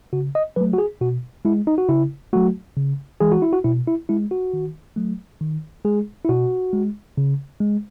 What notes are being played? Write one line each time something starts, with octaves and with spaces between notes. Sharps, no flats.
C#3 F#4
D#5
F#3 A3 B4
F#4
G#4
B2 F#4
G#3 E4
D#4
F#4
C#3 E4
F#3 A3 F#4
C#3
E3 G#3 G#4
F#4
E4
F#4
B2 E4
E4
G#3 E4
F#4
D#3
F#3 A3
D#3
G#3 G#4
E4
B2 F#4
G#3
C#3
G#3